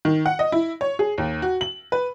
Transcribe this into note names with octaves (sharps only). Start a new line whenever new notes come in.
D#3
F#5
D#5
E4
C#5
G#4
D#2
F#4
F#7
B4